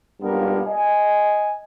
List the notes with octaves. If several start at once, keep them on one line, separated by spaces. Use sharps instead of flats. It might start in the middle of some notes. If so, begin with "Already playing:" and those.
B1 G2 A#3 B3 F4 A#4
D#5 G#5